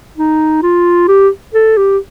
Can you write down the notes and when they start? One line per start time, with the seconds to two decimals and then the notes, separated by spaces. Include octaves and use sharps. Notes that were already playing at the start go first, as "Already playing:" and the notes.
0.17 D#4
0.63 F4
1.08 G4
1.54 A4
1.77 G4